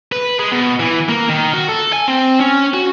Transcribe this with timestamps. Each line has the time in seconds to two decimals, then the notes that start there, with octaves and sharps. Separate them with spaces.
0.12 B4
0.39 G#3
0.52 B2
0.80 E3
1.09 A#3
1.29 D#3
1.54 F#4
1.69 A4
1.93 G#5
2.08 C4
2.40 C#4
2.74 F#4